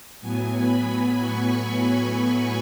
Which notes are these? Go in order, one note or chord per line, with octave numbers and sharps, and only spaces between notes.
A2 F#3 B3 G#5
B5
C#6